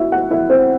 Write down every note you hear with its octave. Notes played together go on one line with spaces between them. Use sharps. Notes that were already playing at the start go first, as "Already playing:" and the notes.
Already playing: E4 F#4 E5
F#4 F#5
E4 E5
C4 C5